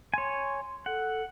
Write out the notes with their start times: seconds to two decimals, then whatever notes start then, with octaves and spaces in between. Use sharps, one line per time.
0.14 C#5 G#5 C6
0.86 A4 F#5